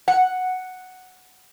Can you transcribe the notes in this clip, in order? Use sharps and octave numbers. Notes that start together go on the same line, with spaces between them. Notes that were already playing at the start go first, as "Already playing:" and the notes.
F#5